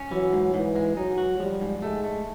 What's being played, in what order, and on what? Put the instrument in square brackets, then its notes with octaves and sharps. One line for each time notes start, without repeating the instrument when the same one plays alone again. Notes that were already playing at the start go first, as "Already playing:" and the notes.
Already playing: [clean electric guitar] C#4
[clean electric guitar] E3 [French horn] F#3
[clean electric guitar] G#2
[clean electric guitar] G#2 [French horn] E3
[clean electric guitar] G#3
[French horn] F#3 [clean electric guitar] D#4
[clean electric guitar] F#4
[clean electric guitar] F3 [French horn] G3
[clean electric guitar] G#2
[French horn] G#3 [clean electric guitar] A3
[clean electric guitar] A3